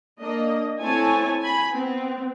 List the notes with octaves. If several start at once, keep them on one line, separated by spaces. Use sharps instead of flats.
A#3 D4 D#5
A3 C4 E4 C#5 G#5 A5
G#5 B5
B3 C4